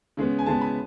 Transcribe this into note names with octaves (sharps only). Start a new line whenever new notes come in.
C#3 G#3 B3
G#5
C#3 G#3 B3 A5
B5